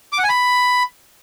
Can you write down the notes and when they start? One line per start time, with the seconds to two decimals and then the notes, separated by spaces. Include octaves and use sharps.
0.13 D6
0.18 F#5
0.24 G#5
0.29 B5